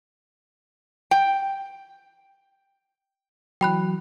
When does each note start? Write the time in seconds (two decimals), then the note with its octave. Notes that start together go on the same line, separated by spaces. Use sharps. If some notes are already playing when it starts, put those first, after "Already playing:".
1.11 G5
3.61 E3 F#3 G5 B5 F#6